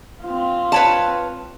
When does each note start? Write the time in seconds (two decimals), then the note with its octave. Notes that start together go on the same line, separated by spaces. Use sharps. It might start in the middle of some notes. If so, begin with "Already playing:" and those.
0.23 C4 F4
0.72 B4 C#5 A5